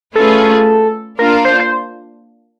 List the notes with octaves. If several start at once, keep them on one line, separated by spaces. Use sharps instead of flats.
A3 C#4 F4 G#4 A4 B4
A#3 D4 F4 A#4
C5
C5